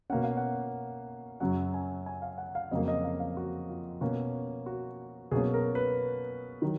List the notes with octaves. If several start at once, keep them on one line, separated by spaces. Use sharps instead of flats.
B2 A#3 C#4 F#5
F5
F#5
F#2 C#3 F#3 F#5
G#5
G#5
F5
F#5
F5
F2 C#3 F#3 A#3 D#5
D#5
F5
F5
F#4
F4
B2 A#3 C#4 F#4
F#4
B2 F#3 A#3 C#4 G#4
A#4
B4
D#3 F#3